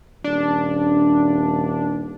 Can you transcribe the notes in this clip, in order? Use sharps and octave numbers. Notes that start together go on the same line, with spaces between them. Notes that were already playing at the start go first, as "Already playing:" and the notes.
D#1 D4